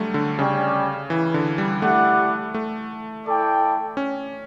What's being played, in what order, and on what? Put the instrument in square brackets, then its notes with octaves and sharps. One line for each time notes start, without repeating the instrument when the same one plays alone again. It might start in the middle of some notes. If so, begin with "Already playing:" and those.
Already playing: [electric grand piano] D3 F#3 G3 A3
D3
[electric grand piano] C#3 [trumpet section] G3 C#4 G4 D5 G5
[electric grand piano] E3
D3
G3
[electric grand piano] A3 [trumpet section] E4 G4 D5 F#5
[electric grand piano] A3
[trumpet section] E4 A4 D5 G5
[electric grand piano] C#4